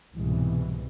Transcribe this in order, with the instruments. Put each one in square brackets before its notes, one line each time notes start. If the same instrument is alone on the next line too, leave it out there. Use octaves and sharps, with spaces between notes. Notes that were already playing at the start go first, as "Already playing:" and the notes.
[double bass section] C2 G#2 B2 E3